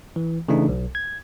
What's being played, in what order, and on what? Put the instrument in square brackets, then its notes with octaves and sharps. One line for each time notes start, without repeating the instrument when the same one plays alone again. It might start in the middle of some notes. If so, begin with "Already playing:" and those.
[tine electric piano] E3
C#3 E3 A3 D4 D#4
B1
G#6